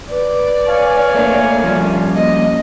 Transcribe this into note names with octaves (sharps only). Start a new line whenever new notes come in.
B4 D5
C#5 F5 G#5
A3 A#3 D4
F3 G3 C#4
A#3 D#5